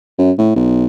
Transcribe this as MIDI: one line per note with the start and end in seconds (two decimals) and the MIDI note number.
0.19 0.32 42
0.38 0.51 45
0.56 0.87 35